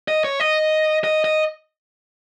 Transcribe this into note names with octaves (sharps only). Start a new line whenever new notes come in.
D#5
C#5
D#5
D#5
D#5